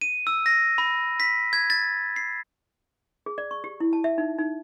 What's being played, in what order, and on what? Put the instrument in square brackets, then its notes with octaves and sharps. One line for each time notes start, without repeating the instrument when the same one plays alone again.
[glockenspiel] D#7
E6
A#6
B5
B6
G#6
A6
C7
[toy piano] G#4
D5
C#6
G4
E4
A5
E5
D#4
D#4